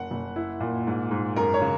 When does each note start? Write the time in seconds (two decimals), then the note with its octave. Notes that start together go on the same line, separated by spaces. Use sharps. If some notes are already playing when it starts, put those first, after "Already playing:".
Already playing: F#1 F#5
0.11 F#1
0.36 E4
0.61 A#2
0.87 G#2
1.11 G#2
1.36 F#2 A#4
1.54 C#5
1.62 C#3